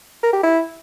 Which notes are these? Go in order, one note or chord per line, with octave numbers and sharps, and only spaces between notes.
A#4
G4
E4